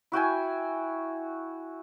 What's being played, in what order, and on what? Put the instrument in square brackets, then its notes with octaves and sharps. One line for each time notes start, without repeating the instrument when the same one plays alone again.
[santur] E4 F#4 G5 G#5